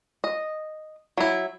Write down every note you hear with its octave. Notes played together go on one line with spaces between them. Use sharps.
D#5
F#3 E4